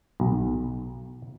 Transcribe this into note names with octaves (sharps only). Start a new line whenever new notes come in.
B1